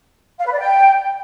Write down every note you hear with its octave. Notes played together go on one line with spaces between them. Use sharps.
F5
B4
D5
G5